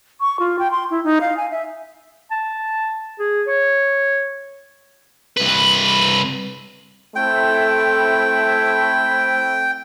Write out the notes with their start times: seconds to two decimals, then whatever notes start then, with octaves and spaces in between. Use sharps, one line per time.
0.21 C#6
0.40 F4
0.59 G5
0.71 C6
0.91 E4
1.04 D#4
1.21 F5
1.37 G#5
1.51 E5
2.31 A5
3.19 G#4
3.48 C#5
5.37 C2 B4
7.16 A3 C4 E4 G5